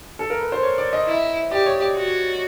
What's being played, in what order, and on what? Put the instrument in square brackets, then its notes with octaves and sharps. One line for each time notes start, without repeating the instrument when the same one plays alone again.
[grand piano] A4
A#4
B4
C5
C#5
D5
D#5
[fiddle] E4
[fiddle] G4 [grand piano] D5
[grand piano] C#5
D5
[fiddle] F#4